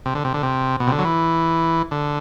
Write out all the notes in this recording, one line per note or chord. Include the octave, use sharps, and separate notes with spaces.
C3
D3
C3
D3
C3
B2
C3
D3
F#3
E3
D3